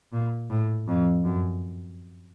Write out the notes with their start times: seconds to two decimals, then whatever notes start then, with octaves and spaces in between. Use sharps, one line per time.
0.13 A#2
0.50 A2
0.88 F2
1.25 F#2